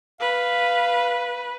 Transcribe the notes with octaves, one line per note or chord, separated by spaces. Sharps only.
B4 F5